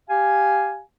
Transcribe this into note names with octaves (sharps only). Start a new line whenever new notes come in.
G4 F5 G#5